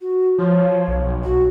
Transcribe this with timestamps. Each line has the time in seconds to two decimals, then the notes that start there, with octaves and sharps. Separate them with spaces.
0.01 F#4
0.38 F3 C#5
0.88 B1
1.24 F#4